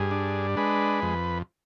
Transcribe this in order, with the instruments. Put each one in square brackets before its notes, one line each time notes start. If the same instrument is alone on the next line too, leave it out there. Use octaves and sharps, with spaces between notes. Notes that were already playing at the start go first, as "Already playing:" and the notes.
Already playing: [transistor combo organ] G2 G#4
D4
G#3 B4
F2